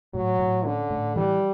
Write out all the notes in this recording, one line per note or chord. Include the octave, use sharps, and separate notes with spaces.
A2 F#3
A2
D3 C#4
A2
E3 G3